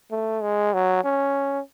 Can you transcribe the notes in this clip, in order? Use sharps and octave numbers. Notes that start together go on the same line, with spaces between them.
A3
G#3
F#3
C#4